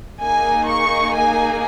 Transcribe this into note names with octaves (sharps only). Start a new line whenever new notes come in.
A#3 D#4 G#4 G#5
C#6
G#5